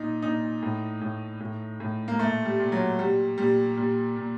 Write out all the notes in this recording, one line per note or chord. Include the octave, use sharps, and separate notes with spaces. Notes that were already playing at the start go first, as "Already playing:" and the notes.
Already playing: A#2 D#4
A#2 D#4
A2
A2
A2
A2
A#3
A#2 A3
G3
A#2
F#3
A#2 G3
A#2 G3
A#2 G3
A#2